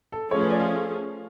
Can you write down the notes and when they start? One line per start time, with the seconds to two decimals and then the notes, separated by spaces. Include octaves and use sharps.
0.12 A4
0.31 F3 A3 C#4 G#4 C#5
0.41 B4
0.50 D5
0.60 F5